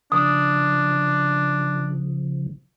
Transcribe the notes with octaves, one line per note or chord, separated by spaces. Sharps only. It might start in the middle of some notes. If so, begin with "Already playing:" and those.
C#3 F3 D4 D#6